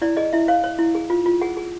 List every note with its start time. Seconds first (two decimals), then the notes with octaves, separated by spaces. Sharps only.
0.02 E4 D5
0.17 G#4 D#5
0.33 E4 E5
0.48 C#5 F5
0.64 C#5
0.79 E4
0.95 G#4
1.10 F4
1.26 F4
1.41 G#4 F#5
1.57 G#4